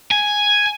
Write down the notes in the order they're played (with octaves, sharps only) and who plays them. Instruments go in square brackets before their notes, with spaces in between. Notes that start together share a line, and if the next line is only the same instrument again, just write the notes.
[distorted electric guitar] G#5